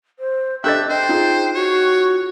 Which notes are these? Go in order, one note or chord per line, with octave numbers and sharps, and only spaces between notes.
C5
D4 G4 A4 D#5 E5 F#6 G6 A6
C5 D#5 G5
D#4 F4 G#4
F#4 C#5